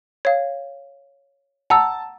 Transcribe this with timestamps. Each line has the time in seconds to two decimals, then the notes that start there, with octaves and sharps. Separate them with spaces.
0.25 C#5 F5
1.70 F#5 A5 A#5 E6